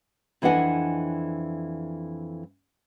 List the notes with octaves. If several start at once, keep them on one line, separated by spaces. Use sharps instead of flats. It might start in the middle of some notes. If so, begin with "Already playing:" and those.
F2 E3 D4 D#5 F#5 G#5